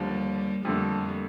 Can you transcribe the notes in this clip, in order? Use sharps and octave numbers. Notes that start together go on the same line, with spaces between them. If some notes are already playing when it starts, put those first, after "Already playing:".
Already playing: D#2 D3 F3 G3 A#3
F2 D3 G3 A3 A#3